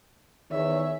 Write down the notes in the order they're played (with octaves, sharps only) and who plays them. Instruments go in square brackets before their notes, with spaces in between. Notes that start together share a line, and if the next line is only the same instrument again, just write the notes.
[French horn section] E2 C#5 [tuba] D#3 [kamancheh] E5